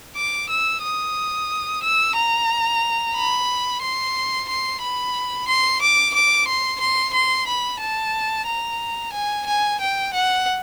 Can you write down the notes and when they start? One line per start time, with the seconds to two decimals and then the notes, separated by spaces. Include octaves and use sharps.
0.16 D6
0.50 E6
0.83 D#6
1.83 E6
2.16 A#5
3.15 B5
3.82 C6
4.49 C6
4.82 B5
5.48 C6
5.82 D6
6.14 D6
6.48 C6
6.81 C6
7.13 C6
7.47 B5
7.81 A5
8.47 A#5
9.13 G#5
9.47 G#5
9.80 G5
10.14 F#5